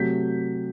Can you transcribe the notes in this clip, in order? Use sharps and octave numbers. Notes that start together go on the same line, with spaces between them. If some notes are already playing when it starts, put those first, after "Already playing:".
Already playing: C3 F#3 A3 G6 B6